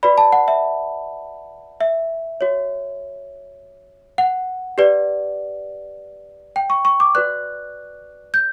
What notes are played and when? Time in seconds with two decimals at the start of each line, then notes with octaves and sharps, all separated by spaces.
0.03 F#4 B4 D5 B5
0.18 A5
0.32 F#5
0.48 E5
1.81 E5
2.41 F#4 C#5
4.18 F#5
4.78 G4 B4 D5
6.56 G5
6.70 C#6
6.85 C#6
7.00 D6
7.15 F#4 B4 D5 F#6
8.34 G6